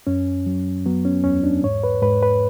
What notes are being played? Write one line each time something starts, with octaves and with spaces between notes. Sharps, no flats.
F#2 C#4
F#3
F#3 B3
C#4
E2 C#4
D4
G#2 C#5
B4
G#2 B4
B4